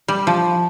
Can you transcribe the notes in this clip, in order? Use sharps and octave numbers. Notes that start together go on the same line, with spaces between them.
G3
F3